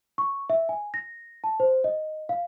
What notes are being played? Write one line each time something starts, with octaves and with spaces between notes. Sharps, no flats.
C#6
E5
G#5
A#6
A5
C5
D#5
F5